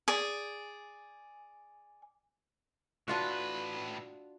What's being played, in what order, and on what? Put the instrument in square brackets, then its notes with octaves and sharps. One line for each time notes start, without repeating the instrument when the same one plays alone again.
[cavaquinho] G#4 D5
[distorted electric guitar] A2 B4 [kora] D4 F4 F#4